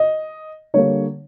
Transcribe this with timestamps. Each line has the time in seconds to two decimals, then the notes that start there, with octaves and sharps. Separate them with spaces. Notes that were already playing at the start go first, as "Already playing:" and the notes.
Already playing: D#5
0.74 D3 G3 A#3 D4 C#5